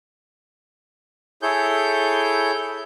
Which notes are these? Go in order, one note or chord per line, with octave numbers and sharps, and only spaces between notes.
E4 G#4 A4 C#5 G6